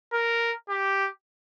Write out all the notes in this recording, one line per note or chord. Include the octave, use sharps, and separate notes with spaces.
A#4
G4